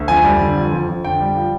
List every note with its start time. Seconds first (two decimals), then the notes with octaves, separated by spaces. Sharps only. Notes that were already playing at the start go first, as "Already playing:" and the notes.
Already playing: D2
0.08 F2 G#5
0.24 G3
0.40 D3
0.57 F2
0.72 F2
0.88 F2
1.04 D3 G5
1.21 G3
1.36 F3